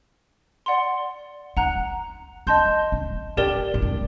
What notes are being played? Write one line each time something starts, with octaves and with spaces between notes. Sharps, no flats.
D5 F#5 C6
D#4 F#5 A#5 F#6
D4 D#5 A5 C6 G6
D4
D4 G4 A#4 D5 G5
D#4
D4